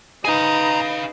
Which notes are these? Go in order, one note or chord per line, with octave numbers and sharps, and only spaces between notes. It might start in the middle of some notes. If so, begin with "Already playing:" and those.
D#4 G#4 B4 D#5 F5 G#5 A#5